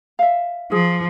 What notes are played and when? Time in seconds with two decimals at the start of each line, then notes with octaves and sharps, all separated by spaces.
0.19 E5 F5
0.71 F3 G#4